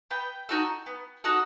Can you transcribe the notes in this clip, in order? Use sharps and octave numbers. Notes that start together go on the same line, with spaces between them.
B3 G5
D#4 F#4 A4
B3
D#4 F#4 A4